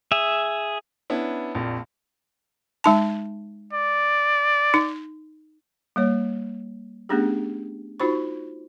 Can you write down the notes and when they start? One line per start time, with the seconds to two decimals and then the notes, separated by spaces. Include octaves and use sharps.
0.12 G#4 E5
1.10 B3 C#4 D4 E4
1.55 A#1 F2 A#2
2.84 G#3 D#4 A5
3.73 D5
4.74 D#4
5.96 G3 A#3 C#5
7.09 A3 B3 C#4 D4 G4 G#4
8.00 D#4 F4 F#4 C5 B5 C#6